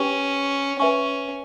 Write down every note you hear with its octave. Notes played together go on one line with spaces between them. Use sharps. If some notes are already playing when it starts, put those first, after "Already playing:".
Already playing: C#4 G4 B4 G5 C#6
C#4 B4 E5 G#5 C#6